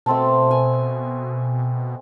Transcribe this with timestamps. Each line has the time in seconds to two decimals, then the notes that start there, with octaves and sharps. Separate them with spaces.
0.06 B2 A3 C4 A5
0.51 G#5